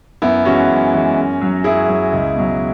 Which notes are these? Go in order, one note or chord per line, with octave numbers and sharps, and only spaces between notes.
F#2 B3 E4
E3 G#3 C#4 F#4
F#2
E3 G#3
F#2
F#3
F#2 E4 G#4
F#3
C#2
B2 F#3